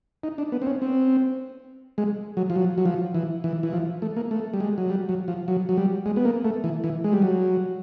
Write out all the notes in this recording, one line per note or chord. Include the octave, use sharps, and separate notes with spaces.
D#4
D4
B3
C4
C#4
C4
G#3
F#3
F3
F#3
F#3
F3
E3
E3
E3
F3
A3
A#3
A3
G3
G#3
F#3
G3
F#3
F3
F#3
F#3
G3
G#3
B3
A#3
A3
E3
E3
G#3
G3
F#3